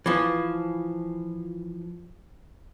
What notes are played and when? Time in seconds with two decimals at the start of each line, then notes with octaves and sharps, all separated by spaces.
0.06 E3 F3